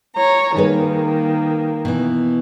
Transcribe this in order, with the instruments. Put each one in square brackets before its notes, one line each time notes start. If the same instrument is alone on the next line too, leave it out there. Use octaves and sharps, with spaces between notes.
[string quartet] C#5 A#5
[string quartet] D#3 A#3 [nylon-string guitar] G3 G#4 B4
[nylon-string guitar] B2 E3